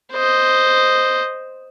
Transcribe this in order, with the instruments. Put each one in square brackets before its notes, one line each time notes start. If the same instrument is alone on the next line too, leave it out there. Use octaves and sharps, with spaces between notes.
[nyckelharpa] C5 D#5